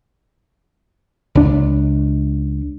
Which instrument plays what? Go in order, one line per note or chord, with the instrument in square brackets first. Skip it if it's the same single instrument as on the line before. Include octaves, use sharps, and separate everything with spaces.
[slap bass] C#2 D4